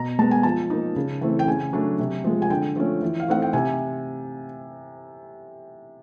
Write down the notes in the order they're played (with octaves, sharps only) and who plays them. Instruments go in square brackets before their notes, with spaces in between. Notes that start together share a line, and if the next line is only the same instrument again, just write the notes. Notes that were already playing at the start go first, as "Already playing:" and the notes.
Already playing: [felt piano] B2 A#5
G#3 B3 A5
G#5
F3 A5
A#3 D#4
C#3
E3 A3 C4
G5
C#3 G#5
F#3 A3 D4
C3
F3 G#3
G#5
D3 G5
F3 A3 C#4
E3
F5
A3 C4 D#4 F#5
G5
C3 G#5